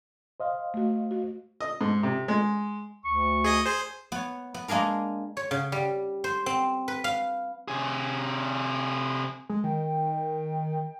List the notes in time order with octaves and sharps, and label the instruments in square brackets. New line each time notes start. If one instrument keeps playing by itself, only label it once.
[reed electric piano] C5 D#5 F5
[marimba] A3 F#4
F#4
[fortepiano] D#5
G#2
C3
G#3
[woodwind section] D2 C#6
[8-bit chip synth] G#4 D#5 D#6
G#4 C5
[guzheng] B3 C#5
B3
G#3 A#3 D4 G#4 A#4
C#5
C#3
G3
C5
C4
B4
F5
[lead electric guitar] C3 G#4
[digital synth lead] G#3
[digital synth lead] D#3 [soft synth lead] G5